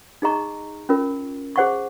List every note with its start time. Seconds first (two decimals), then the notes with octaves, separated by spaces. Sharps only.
0.22 D#4 G#4 D#5 A#5 C#6
0.89 C#4 F4 A#4
1.56 G#4 C5 F#5 C#6